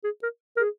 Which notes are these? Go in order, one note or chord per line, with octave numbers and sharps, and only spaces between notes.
G#4
A#4
A#4
G#4